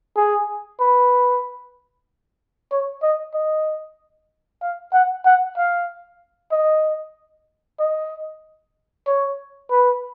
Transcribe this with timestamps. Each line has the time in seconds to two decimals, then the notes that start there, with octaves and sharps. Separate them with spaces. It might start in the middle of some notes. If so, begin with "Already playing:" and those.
0.16 G#4
0.80 B4
2.72 C#5
3.03 D#5
3.34 D#5
4.62 F5
4.93 F#5
5.26 F#5
5.57 F5
6.52 D#5
7.80 D#5
9.07 C#5
9.71 B4